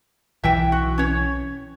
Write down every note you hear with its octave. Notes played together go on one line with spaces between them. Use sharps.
B1 E3 E5 G5
F#4
C#4 C#5